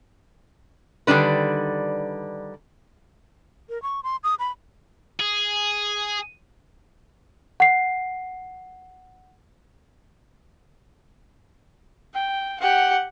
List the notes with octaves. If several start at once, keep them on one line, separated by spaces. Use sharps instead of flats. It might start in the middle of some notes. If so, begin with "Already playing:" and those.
D3 D#3 G3 D4 B4
A#4
C#6
C6
D#6
B5
G#4
F#5 C7
G5
G4 F#5